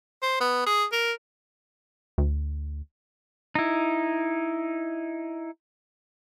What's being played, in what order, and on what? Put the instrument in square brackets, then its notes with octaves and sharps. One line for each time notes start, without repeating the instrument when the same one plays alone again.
[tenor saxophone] C5
B3
G#4
A#4
[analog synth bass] D2
[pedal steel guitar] D#4 E4